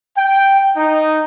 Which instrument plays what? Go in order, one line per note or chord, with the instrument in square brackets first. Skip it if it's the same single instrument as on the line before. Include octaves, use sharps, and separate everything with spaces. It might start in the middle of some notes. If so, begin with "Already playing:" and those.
[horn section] G5
D#4